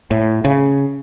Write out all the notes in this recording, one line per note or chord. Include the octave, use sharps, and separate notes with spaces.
A2
C#3